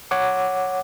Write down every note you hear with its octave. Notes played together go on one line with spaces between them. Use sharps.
C#5 F#5 D6